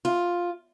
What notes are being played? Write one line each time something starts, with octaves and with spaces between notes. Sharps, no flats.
F4